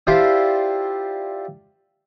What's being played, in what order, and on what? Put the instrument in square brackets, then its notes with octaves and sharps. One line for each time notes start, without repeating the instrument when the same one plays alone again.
[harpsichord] D4 E4 F4 G4 C5